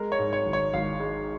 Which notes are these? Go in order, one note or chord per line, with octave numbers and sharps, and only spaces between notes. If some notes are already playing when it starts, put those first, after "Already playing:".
Already playing: G#3 A#4
C#5
G#2
C#5
G#1
C#5
G#1 F5
G#3